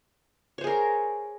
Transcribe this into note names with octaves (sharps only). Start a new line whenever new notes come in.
G#4 A#4 C5 C#5